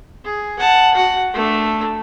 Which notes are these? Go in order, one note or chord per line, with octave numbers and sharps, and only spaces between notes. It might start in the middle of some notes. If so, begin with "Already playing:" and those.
G#4
F#5 A5
F#4 F#5
A3 D4